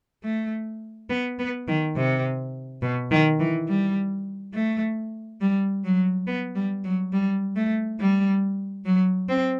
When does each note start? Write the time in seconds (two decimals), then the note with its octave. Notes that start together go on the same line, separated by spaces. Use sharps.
0.24 A3
1.10 B3
1.39 B3
1.68 D#3
1.96 C3
2.82 B2
3.11 D#3
3.40 E3
3.68 G3
4.54 A3
5.41 G3
5.85 F#3
6.27 B3
6.56 G3
6.84 F#3
7.13 G3
7.56 A3
7.99 G3
8.86 F#3
9.29 C4